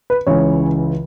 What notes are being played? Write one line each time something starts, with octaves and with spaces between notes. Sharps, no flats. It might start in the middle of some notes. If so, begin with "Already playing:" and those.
B4
C#2 C#3 E3 C#5